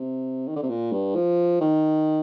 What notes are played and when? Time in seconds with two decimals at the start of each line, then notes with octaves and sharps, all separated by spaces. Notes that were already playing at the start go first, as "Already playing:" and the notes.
Already playing: C3
0.48 D#3
0.56 D3
0.63 C3
0.69 A#2
0.92 G2
1.15 F3
1.61 D#3